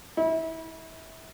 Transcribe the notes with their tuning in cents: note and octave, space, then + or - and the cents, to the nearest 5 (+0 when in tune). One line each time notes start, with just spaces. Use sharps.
E4 -30